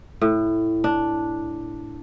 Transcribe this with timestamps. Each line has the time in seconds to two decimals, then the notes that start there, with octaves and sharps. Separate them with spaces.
0.21 A2
0.84 D4